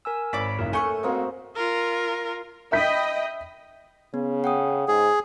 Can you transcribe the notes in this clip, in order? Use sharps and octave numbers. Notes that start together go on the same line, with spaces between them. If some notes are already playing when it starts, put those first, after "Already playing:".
A#4 G#5 E6
G#1 C#5 D5 B5 D6 B6
F#1 B1 E2 A#4
A3 G#5 C#6 F#6
A#3 C4 F#4 C5 D#5
F4 A#4
D#5 E5 G5 B5 G6 B6
C#3 B3
F#5 G5 D#6
G#2 G#4